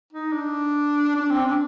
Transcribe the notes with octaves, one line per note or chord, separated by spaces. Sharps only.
D#4
D4
D4
C4
D4